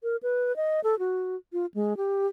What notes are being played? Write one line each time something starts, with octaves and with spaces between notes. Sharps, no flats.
A#4
B4
D#5
A4
F#4
F4
G#3
G4